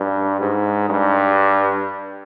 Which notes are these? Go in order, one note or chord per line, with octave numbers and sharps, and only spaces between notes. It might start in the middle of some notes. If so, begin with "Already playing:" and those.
Already playing: G2
G#2
G2